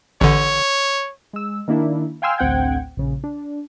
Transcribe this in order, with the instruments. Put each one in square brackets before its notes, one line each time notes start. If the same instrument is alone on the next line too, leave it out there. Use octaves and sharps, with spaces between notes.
[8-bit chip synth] A1 D3 [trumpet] C#5
[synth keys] G#3 E6
D#3 A#3 D4 E4
F5 G5 G#5 C6 E6 F6
A1 D2 C4 F#5 G5 G#6
A#1 C#3
D4